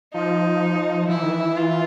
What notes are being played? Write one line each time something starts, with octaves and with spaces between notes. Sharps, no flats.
F3 D#4
F3 E4
E3
D#3
E3
F4